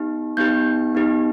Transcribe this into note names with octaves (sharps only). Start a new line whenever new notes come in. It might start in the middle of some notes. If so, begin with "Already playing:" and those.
Already playing: B3 D#4 G4
B3 D#4 G4 G6
B3 D#4 G4